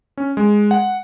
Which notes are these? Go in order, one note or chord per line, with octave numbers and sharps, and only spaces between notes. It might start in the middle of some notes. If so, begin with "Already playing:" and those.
C#4
G#3
F#5